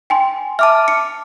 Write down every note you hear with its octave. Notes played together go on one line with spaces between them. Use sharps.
G5 G#5 C6
E5 A5 D6 F6
C#7